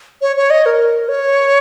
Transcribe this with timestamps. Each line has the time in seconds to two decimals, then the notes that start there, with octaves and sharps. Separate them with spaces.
0.22 C#5
0.37 C#5
0.50 D#5
0.66 A#4
1.09 C#5